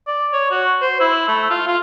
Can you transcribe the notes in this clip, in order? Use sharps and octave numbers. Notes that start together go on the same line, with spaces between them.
D5
C#5
F#4
C5
E4
A3
F4
F4